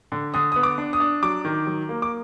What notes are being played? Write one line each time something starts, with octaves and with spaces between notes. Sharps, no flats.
D3
D3 D#6
B3 D#6
D6
D4
D#6
D4
F#3 D6
D#3
F#3
A#3
D6